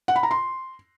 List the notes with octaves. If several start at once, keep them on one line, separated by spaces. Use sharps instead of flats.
F#5
B5
A#5
C6